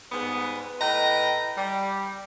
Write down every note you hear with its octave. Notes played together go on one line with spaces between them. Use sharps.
G#2 G3 B3
A2 B4 D#5 G5 A#5
G3